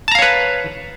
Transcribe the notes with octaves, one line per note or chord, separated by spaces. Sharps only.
B4 C#5 F5 A5 A#5